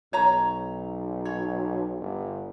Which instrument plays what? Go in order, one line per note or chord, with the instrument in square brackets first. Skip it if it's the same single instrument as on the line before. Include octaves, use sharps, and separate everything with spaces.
[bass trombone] B1 [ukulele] C#5 A#5
[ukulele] C#5
[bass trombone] G1